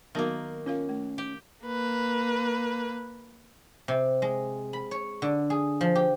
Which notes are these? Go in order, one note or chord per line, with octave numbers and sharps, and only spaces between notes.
D#3 F#3 A#3 B3 F#4
C#4 F4 A#4 F5
A3
G4
A#3 B4
C3
G#3
B5
C#5
D3
G#4
F3
G4